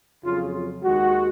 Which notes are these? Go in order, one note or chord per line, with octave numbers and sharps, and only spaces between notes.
F2 C#3 F#3 F4
D#2 D#3 G#3 F#4